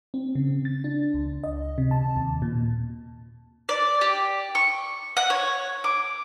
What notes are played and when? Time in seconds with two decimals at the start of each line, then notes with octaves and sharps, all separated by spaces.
0.14 C4
0.35 C#3
0.65 A6
0.84 D4
1.14 C#2
1.44 D#5
1.78 C3
1.91 A5
2.16 D#2
2.42 A#2
3.69 D5
4.01 G4
4.55 C#6
5.17 F#5
5.30 C#5
5.84 D6